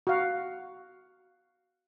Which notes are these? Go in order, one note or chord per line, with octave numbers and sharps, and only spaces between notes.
F#4 F5